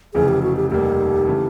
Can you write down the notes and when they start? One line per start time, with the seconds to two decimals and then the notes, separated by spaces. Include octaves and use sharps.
0.14 F1 F2 C#3 E3 G#4
0.28 G4
0.43 F#4
0.56 G4
0.71 F1 D#2 D#3 G3 A#3 G4
1.27 C#3 E3 A3